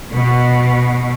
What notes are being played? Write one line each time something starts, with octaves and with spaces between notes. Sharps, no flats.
B2